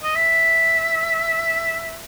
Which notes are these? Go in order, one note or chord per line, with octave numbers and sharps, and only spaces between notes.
D#5
E5